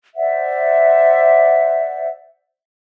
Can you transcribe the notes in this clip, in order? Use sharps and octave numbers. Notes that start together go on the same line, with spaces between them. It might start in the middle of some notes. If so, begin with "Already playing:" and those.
C5 D5 E5 F#5